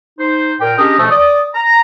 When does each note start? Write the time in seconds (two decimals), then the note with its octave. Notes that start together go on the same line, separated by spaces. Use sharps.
0.19 D#4 C5
0.60 A#2 A#4 G5
0.78 C#4 D4 G4 G#4 A#4 D#5
0.99 B2 F3 A3
1.10 D5 D#6
1.55 A#5